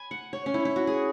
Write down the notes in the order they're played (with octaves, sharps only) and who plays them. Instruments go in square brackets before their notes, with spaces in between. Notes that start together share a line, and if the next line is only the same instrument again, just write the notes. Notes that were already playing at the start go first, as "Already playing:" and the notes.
Already playing: [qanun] G#5 B5
F#5
C#5
C#4
E4
E4
F#4
G#4